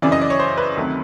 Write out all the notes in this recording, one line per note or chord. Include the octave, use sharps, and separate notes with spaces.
F#2 C#3 E3 D5
D#5
D5
C#5
C5
B4
D2 C3 D#3 F#3 A3